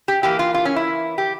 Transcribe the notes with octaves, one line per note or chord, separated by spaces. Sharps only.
G4
E3 A#3 G4
F4
F4
C#4
E4
G4